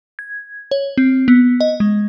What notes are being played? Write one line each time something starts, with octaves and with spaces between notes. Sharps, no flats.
G#6
C#5
C4
B3
D#5
G#3